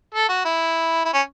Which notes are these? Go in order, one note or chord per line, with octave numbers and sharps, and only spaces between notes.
A4
F#4
E4
E4
C#4